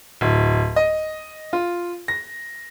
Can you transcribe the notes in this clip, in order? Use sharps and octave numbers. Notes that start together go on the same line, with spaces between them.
D1
D#5
F4
A#6